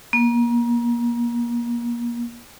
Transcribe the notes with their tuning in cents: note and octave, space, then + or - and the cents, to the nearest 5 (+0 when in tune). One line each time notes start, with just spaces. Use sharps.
A#3 +30